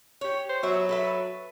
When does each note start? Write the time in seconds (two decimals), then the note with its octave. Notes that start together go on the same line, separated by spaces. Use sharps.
0.21 G4 C#5
0.49 C5
0.63 F#3 B3 E5
0.89 A4 B4 E5